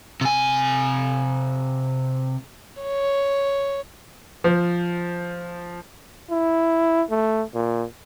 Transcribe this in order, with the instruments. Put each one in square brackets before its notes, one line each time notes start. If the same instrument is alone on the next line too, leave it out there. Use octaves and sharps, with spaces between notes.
[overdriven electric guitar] C3 G#5
[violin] C#5
[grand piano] F3
[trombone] E4
A3
A#2